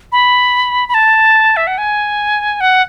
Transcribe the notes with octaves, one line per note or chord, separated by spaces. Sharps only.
B5
B5
A5
E5
F#5
G#5
F#5